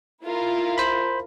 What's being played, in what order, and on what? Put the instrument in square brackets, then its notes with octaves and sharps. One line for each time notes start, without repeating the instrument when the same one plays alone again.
[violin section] E4 F4 A#4
[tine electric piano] C5 B5